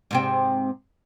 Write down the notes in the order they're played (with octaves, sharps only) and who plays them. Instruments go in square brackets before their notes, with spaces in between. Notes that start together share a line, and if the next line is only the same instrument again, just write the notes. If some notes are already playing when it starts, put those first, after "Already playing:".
[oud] G#2 C3 C4